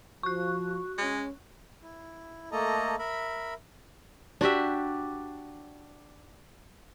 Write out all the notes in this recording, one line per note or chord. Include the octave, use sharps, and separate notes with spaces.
F3 F#4 C#6 F#6
G#3 C#4
E4
A3 A#3 A4 D#5 A#5
A#4 E5 B5
D4 F#4 G4 E5